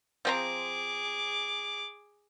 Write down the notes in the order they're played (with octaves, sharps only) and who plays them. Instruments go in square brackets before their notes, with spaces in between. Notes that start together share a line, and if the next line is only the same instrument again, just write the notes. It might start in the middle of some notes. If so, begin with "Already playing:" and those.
[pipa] F3 C4 A#5 [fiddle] G#4 D6